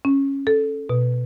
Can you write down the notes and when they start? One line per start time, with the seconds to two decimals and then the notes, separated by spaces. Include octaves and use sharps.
0.05 C#4
0.47 A4
0.89 B2